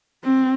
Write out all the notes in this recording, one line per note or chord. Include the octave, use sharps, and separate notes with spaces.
C4